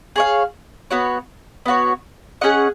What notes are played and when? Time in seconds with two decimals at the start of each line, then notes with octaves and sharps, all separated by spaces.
0.16 G#4 C#5 F5
0.90 B3 F#4 C#5
1.66 B3 F#4 C#5
2.41 C#4 G#4 D#5 F#5